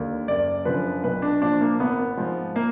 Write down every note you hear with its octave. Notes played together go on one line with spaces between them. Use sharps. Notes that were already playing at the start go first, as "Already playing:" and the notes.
Already playing: D#2 D3
F#1 D5
F#2 D3 F3 B4
B1 B4
D4
A#2 F3 D4
A#3
G#1 B3
G#2 F3
A#3